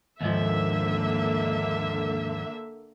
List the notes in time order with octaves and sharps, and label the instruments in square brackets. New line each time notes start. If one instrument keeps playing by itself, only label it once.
[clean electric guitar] D#2 G#2 F3 [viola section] D3 A#3 E5